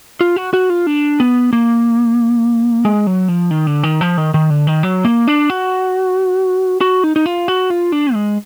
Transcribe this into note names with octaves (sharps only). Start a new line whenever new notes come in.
F4
F#4
F#4
F4
D4
B3
A#3
G#3
F#3
F3
D#3
D3
D#3
F3
D#3
D#3
D3
D#3
F#3
A#3
D4
F#4
F#4
D#4
D#4
F4
F#4
F4
D4
G#3